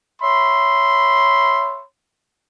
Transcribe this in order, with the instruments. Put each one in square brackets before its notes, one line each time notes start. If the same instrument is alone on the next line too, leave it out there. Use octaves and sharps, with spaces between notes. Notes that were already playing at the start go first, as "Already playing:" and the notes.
[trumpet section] C#5 E5 B5 C6